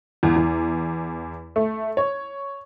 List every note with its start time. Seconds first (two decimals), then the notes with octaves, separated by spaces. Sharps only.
0.23 E2
0.36 E2
1.56 A3
1.97 C#5